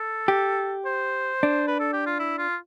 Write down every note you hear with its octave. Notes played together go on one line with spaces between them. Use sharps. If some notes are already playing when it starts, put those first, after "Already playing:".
Already playing: A4
G4
C5
D4
B4
A4
G4
F4
E4
F4